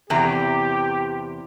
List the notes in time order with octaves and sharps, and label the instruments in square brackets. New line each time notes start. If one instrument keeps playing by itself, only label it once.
[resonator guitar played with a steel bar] E2 C3 A#5 [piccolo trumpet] G4